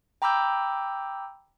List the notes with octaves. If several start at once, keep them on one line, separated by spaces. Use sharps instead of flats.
G5 A#5 B5 D6 E6 G6